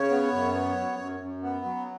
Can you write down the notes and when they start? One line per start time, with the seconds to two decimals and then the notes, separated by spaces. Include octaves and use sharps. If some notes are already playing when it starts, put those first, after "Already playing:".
Already playing: C#3 C#5
0.11 B3
0.33 F#2
0.54 B3
0.76 F#2
0.99 F#2
1.20 F#2
1.43 B3
1.65 F#3